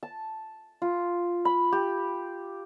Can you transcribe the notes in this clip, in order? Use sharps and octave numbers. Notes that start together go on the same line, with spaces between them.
A5
F4
B5
G4